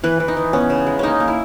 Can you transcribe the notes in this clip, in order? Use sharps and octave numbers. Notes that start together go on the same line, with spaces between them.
E3 B4
E3
D#4
E3
B3 C#4
C#3
G#3
A#3 C#4 D#4
A#3
E4